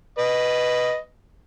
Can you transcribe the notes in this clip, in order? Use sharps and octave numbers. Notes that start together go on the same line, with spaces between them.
B4 D#5